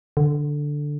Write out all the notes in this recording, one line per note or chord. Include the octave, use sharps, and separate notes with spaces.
D3